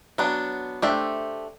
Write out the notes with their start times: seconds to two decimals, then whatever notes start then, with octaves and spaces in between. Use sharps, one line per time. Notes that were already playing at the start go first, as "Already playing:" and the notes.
0.18 F#3 B3 D4
0.82 A3 D4 G4 C5 E5